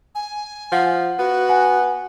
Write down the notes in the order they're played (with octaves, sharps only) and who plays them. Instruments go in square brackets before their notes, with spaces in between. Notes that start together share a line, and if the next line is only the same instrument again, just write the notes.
[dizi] G#5
[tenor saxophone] F3 [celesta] F#5
[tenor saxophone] B3 [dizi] F#4
[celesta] F#5 G#5